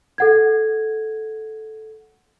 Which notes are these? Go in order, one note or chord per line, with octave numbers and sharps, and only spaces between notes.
A4 F#5 G#6